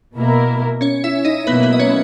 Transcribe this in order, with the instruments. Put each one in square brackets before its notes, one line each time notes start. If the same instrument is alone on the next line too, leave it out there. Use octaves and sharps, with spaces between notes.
[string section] B2 A#3 E4 A#4
[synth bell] C#4 C#5
E4 E5
D#4 D#5
[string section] B2 F#3 A#3 E4 [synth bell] B3 B4
[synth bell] B3 B4
D#5
C#4 C#5